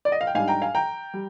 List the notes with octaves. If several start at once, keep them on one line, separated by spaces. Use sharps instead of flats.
D5
D#5
F5
G5
G#2 G3 D4 F5 G#5
G5 A#5
F5 G#5
G5 A#5
G3